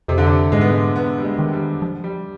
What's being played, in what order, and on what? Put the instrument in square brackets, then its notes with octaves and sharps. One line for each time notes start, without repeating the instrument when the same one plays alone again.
[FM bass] F2 [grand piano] C3
[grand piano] D3
C3
[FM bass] G#2 [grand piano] G#3
[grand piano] B3
G#3
B3
G3
G#3
[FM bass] D#3
[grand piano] G3
[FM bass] F3
[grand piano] G3